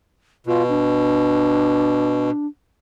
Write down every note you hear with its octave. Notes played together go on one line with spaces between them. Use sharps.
B2 F4
D4